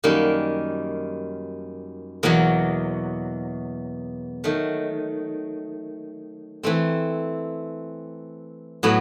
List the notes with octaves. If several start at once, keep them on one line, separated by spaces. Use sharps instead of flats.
F#2 D#3 G3 A#3
E2 B2 F#3 A#3
D#3 F#3 A3
E3 A3 C4
A2 F#3 B3